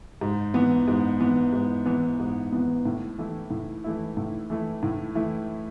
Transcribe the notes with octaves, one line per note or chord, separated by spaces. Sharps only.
G#2
E3 B3
G#2
E3 B3
G#2
E3 B3
G#2
E3 B3
A2
E3 A3 E4
A2
E3 A3 E4
A2
E3 A3 E4
A2
E3 A3 E4